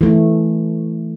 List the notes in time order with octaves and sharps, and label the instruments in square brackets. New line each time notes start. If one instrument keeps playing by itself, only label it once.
[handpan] E3 A3